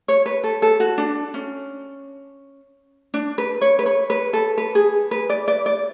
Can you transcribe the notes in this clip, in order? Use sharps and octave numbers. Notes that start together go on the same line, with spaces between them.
C#5
B4
A4
A4
F#4
D4
C#4
D4
B4
C#5
B4
C#5
B4
A4
B4
G#4
B4
D5
D5
D5